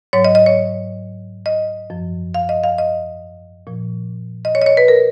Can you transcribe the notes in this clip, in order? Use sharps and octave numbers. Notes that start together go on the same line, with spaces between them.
G#2 F#3 C#5
D#5
D#5
C#5
D#5
F#2 F3
F5
D#5
F5
D#5
A#2 F3
D#5
C#5
D#5
C#5
B4
A#4